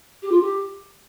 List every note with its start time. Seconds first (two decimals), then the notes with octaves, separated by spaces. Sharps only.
0.23 G4
0.32 F4
0.41 G4